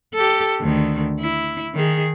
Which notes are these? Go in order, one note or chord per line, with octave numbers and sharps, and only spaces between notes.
G4 A4
D2 D#3
E4
D#3 G#4